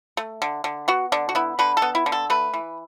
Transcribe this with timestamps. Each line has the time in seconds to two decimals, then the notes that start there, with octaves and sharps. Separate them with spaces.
0.17 A3
0.42 D3
0.64 D3
0.88 B3 F#4
1.12 D3 D4
1.29 F#4
1.35 B3 E4
1.59 D3 B4
1.77 A4
1.82 B3
1.95 E4
2.06 D3
2.12 A4
2.30 A3 B4
2.54 E3